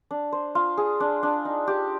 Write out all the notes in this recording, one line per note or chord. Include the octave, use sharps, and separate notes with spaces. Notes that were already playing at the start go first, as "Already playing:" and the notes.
D4
C5
F4
G#4
D4
D4
D#4
G4